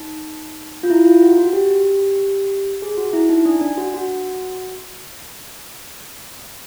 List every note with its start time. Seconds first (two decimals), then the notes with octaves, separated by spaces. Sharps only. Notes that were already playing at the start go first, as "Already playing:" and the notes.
Already playing: D#4
0.83 F4
0.90 E4
1.05 F4
1.22 F#4
1.38 F#4
1.53 G4
2.82 G#4
2.97 F#4
3.13 E4
3.29 D#4
3.45 D4
3.61 D4
3.77 F#4
3.94 F#4